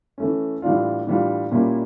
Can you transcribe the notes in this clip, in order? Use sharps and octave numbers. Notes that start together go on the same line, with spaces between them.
E3 A3 C#4
A2 E3 G3 D4 F4
A2 E3 G3 D4 F4
A#2 G3 A#3 C#4 E4